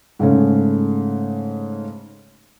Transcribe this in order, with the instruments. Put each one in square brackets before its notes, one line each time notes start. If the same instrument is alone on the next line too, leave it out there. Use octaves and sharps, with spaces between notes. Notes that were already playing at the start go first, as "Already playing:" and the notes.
[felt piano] G#2 C#3 A3 C#4